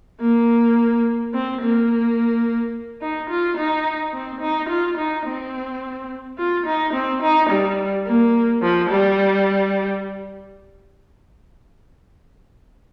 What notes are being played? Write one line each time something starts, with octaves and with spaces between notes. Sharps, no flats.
A#3
C4
A#3
D#4
F4
D#4
C4
D#4
F4
D#4
C4
F4
D#4
C4
D#4
G3
A#3
F3
G3